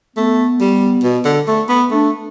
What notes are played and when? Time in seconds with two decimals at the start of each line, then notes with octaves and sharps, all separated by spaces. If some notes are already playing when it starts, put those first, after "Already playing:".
0.16 A3 B3
0.61 G3
1.03 B2
1.25 D3
1.47 A3
1.69 B3
1.90 A3 D4